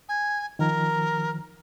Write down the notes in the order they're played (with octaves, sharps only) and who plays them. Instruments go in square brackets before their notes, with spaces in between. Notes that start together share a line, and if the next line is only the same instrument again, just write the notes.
[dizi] G#5
[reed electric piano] D#3 F3 [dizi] A#4